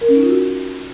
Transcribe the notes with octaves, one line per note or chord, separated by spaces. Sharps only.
A#4
C#4
D#4
F4
F#4